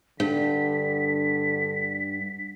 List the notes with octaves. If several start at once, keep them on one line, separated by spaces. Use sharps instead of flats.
G2 D3 B6